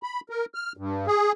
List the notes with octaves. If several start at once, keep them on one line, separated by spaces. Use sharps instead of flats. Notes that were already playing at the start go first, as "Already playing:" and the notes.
B5
A#4
F6
G2
G#4